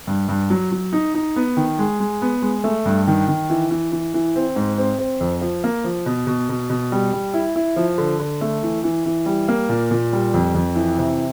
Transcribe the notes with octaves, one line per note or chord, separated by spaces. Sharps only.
G2
G2
F#3
F#3
D#4
D#4
B3
D#3
G#3
G#3
B3
G#3
A3
G2
D#3
D#3
E3
E3
E3
E3
C4
G#2
C4
C4
F2
F3
A#3
F3
B2
B2
B2
B2
G3
G3
E4
E4
F3
D3
D3
A3
E3
E3
E3
G3
A#3
A#2
A#2
G3
F2
F2
E3
C3